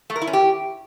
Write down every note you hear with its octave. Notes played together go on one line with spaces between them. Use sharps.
A3
A#4
E4
C#4
G4